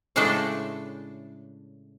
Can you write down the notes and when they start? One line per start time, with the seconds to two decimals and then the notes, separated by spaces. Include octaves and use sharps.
0.16 A2 C#3 G#3 A3 D4 A4